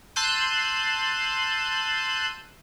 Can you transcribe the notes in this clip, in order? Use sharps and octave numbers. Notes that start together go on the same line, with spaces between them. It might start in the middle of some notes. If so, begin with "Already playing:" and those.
A5 C6 E6 F#6 G6 D#7